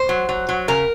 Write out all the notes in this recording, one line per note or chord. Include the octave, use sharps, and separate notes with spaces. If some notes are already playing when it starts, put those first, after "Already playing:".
Already playing: C5
F#3
F#3
F#3
C#3 A#4